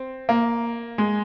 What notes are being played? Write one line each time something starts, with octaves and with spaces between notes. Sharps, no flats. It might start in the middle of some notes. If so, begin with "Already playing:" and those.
Already playing: C4
A#3
G#3